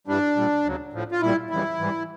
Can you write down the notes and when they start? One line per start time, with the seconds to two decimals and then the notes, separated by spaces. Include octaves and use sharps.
0.07 G2 E3 G3 D4
0.36 A#2 G3
0.65 D2 C#3 F#3
0.93 A2 F3
1.12 F4
1.21 A#2 G3 E4
1.50 F2 C#3 E3 G3 E4
1.79 G#2 E3 G3